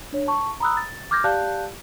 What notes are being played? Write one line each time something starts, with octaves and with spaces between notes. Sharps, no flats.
D4 C#5
A5 C#6
A#5 B5 D#6 E6 F#6
A6
D6 F6 G6 G#6 A#6
G4 D5 F5 A5 F#6 G6